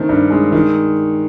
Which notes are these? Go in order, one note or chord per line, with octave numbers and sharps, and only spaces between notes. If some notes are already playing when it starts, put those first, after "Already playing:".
Already playing: D#3 A3 C4
G2
G#3
D#3